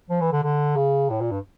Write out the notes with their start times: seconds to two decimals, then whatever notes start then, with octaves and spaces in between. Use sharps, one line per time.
0.10 F3
0.21 E3
0.32 D3
0.43 D3
0.76 C#3
1.10 A2
1.21 A#2
1.31 G2